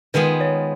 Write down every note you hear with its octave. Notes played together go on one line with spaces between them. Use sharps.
D#3 G#3 B3 F4 G#4 B4
C#5